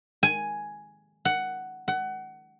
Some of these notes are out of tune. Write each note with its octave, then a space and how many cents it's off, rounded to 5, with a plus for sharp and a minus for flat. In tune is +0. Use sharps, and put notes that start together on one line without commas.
G#5 +5
F#5 +10
F#5 +25